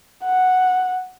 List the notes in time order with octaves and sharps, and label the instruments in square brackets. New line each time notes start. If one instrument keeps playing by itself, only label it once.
[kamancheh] F#5